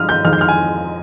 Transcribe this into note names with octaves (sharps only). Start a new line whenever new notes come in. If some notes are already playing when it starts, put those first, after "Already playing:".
Already playing: G2 F3 G#3 D#6 F6
G6
F2 D#3 G#3 F6
G6
F6
G#5